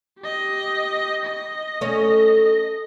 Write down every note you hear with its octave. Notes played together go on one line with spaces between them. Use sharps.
G4 D#5
D#5
A3 C#4